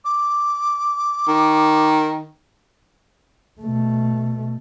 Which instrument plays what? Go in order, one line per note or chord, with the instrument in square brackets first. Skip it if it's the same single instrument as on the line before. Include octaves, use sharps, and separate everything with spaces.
[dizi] D6
[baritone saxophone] D#3
[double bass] B2 A3